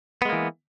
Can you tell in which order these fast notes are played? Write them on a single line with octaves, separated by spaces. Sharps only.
B3 G#3 A#3 E3